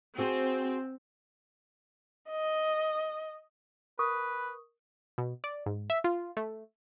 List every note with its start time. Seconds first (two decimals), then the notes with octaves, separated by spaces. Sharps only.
0.18 C4 F#4 G#4
2.30 D#5
3.99 A#4 B4 C#6 D#6
5.18 B2
5.44 D5
5.66 G#2
5.90 E5
6.04 F4
6.37 A3